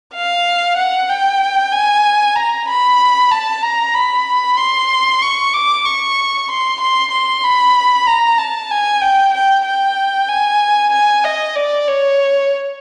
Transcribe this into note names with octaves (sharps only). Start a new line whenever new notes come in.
F5
F#5
G5
G#5
A#5
B5
A5
A#5
B5
C6
C#6
D6
C#6
C6
C6
C6
B5
A#5
A5
G#5
G5
G5
G5
G#5
G#5
D#5
D5
C#5